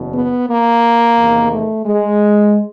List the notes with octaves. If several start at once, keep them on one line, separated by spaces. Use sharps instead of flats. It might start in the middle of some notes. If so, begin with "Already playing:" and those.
Already playing: F#1 E2 B2
B3
A#3
E2 C3 D#3
A3
G#3